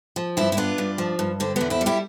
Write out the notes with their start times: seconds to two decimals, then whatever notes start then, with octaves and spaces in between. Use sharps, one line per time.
0.16 F3
0.37 G2 C4 E4
0.52 E4
0.57 B3 D4 F4
0.78 G2
0.98 F3
1.19 G2
1.40 D3 C4
1.56 E2 B3 D4
1.70 C4 E4
1.81 G3
1.86 E4 G4